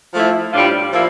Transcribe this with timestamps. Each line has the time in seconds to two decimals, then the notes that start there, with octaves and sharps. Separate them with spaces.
0.14 F3 A3 E4
0.53 A2 G3 D4 F4
0.92 F3 A#3 E4